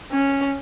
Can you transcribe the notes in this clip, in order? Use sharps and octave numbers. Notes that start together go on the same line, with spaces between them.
C#4